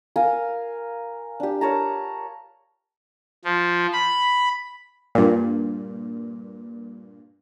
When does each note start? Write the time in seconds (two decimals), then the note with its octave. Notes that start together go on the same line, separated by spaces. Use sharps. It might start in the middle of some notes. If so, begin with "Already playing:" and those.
0.16 A#4 F5 G#5 A#5
1.40 D4 G4
1.61 A#4 C#5 A5 A#5
3.45 F3
3.92 B5
5.15 G2 A#2